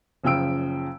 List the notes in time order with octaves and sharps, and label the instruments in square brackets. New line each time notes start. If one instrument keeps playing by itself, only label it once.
[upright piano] F#1 C#3 F3 G5 E6 D7